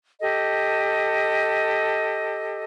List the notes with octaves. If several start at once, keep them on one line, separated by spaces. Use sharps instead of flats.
G4 A4 D#5